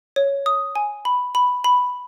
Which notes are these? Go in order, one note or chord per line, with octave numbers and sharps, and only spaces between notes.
C#5
D#6
G#5
B5
B5
B5